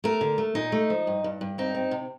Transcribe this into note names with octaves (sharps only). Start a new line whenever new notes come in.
A3 A#4
D3
A3
A#2 D#4
A3
F3
G2
G2
G2
C4 D#4
C4
C3